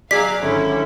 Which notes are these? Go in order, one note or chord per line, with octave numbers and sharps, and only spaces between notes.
F#3 G#4 D5 F5 A#5 B6
G#1 D3 C#4 E4